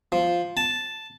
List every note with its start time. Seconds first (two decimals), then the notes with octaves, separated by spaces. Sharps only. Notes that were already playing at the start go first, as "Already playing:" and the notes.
0.12 F3
0.57 A5